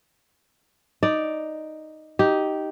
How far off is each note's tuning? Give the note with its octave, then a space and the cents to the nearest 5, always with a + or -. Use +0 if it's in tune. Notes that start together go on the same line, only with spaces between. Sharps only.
D#4 +0 D5 +0
D#4 +5 G4 -10